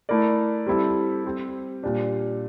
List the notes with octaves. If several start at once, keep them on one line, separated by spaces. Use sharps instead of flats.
A3 E4 A#4 D5
G3 C4 E4 A4
G3 C4 G4
A#2 G3 D4 G4